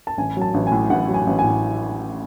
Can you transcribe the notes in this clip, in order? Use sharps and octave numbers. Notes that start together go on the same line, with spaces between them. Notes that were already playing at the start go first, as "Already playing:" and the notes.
A5
A1 G#5
F#3 A5
A1
A2 G#5
A1 F#5
F#3
G#5
A1
G#5
A2